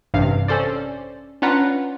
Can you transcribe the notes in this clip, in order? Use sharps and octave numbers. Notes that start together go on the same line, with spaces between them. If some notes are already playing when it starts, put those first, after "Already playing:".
A1 G2 C3 F5
C#4 A4 C5 D5
C#4 D4 F4 B4 F#5 A#5